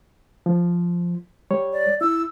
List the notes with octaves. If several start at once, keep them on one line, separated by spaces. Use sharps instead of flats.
F3
G3 C#5
D5
E4 E6